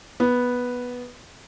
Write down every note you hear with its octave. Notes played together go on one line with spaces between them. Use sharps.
B3